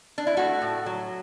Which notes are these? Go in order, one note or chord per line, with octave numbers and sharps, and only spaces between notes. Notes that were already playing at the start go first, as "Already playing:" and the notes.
D4
E4
A3 F#4
A2
F#3